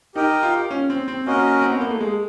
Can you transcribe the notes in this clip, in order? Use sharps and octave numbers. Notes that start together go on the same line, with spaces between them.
D#4 G4 A#4 D#5 G5
F4
C#4
C4
C4
A#3 C#4 F#4 A#4 D#5
C4
B3
A#3
A3
G#3